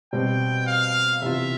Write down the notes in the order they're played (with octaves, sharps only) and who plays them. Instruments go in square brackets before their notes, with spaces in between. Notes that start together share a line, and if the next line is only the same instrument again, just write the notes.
[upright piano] B2 G3 C4 [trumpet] G5
[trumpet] F5
[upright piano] C3 E3 B3 F4 [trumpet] E5